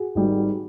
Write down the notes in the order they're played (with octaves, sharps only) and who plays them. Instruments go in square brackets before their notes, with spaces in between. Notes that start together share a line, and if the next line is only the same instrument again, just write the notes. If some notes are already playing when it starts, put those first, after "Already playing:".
Already playing: [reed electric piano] F#4 G#4
[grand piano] G#1 G#2 D#3 G3